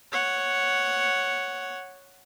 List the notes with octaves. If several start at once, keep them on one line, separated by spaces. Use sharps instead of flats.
C#5 F#5